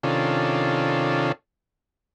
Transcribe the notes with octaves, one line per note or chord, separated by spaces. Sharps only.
C3 D#3 C#4 D4 F4 A4